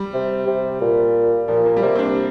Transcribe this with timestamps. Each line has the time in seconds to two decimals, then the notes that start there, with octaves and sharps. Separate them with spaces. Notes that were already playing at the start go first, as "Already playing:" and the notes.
Already playing: G3
0.14 C3
0.47 C3
0.81 A#2
1.48 A#2 F3
1.66 A#3
1.77 G3
1.82 C3 A#3
1.96 C4
1.99 D4